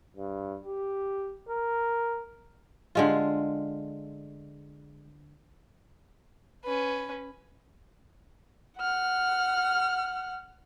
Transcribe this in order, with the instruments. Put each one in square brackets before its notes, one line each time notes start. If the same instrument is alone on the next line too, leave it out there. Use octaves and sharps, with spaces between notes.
[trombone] G2
G4
A#4
[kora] D3 G#3 F4
[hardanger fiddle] C#4 B4
[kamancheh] F#5 F6